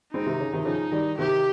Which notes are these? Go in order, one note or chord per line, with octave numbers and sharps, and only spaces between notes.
G#3 C4 D#4
C3 D#3
C#3
C3 D#3
C#3 F3 D#4
D#3 G3
C3 D#3 G4